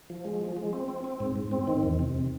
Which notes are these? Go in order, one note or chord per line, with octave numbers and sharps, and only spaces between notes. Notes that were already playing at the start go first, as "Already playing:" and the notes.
F3
G#3
F3
G#3
C4
C4
C4
G#2
G#2
C4
D#3
E2
C3